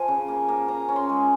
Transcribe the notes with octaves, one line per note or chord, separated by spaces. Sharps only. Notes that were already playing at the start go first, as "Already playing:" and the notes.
Already playing: F3 F5 G#5
C#3
A#3
A#3
C#4 A#5
C#4
C6
G#3